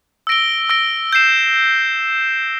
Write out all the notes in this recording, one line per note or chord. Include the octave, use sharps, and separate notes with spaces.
E6 A#6 D7 G7
E6 A#6 D7 G7
G6 C7 E7